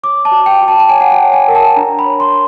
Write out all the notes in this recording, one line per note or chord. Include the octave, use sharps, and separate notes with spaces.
C#5 D6
A5
F#4
G5
F#4
A5
A5
C#5 G#5
F#5
G5
C#5
G#5
A#4
A5
D4 A#5
B5
C#5
C6